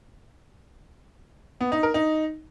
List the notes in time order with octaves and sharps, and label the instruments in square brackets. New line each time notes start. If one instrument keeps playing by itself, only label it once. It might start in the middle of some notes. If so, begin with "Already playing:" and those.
[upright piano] B3
D#4
A#4
D#4